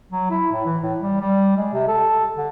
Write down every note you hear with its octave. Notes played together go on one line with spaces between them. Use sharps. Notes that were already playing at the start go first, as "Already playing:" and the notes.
F#3
E4
A2
E3
A2
G3
G3
G#3
C3
A4
D3